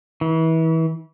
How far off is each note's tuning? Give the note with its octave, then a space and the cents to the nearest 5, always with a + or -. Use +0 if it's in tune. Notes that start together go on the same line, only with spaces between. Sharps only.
E3 -30